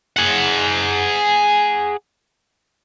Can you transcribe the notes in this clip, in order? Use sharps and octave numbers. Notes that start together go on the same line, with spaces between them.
G#4 F#5